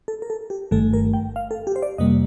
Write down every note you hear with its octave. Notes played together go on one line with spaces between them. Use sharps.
A4
A#4
A4
G4
G1 G2 D#3 A3 A4
A#4
G5
F5
A4
G4
C5
D5
F2 C3 G3 A#3 D#5